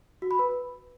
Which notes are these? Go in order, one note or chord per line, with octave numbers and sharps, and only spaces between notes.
F#4
B5
B4